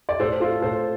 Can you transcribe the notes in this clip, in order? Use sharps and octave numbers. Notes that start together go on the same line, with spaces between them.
D5
A2 A4 C5
F4 A4
A2 A4 C5